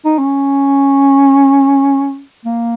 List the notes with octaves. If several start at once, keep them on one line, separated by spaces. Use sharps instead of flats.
D#4
C#4
A#3